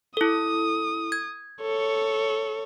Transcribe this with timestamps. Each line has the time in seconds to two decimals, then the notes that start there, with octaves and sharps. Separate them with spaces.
0.17 E4 A4 D#6
1.12 G#6
1.61 A4 C#5